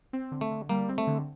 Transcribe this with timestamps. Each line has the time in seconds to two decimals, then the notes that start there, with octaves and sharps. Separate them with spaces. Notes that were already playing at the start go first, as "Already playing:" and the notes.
0.13 C4
0.32 D3
0.41 A3
0.51 D3
0.69 G3 A#3
0.89 C4
0.98 A3
1.07 D3